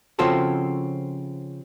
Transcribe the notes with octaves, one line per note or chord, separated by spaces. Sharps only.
C#3 F3 C4 F4 F#4 A4